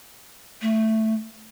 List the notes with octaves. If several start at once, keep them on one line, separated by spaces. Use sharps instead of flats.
A3